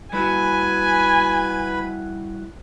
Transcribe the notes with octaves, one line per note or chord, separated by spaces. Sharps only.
G3 E4 F#4 B4 G#5 B5